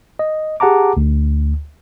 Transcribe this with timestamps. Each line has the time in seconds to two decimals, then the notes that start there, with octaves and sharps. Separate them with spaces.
0.19 D#5
0.60 G4 G#4 F#5 A5 A#5 D6
0.97 D2